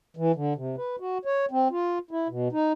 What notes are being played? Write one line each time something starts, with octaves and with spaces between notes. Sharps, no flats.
E3
D3
C3
B4
F#4
C#5
C4
F4
E4
B2
D#4